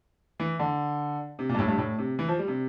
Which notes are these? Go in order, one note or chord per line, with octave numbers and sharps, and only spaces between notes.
E3
D3
C3
A#2
G2
A2
G2
A2
C3
E3
F3
G3
C3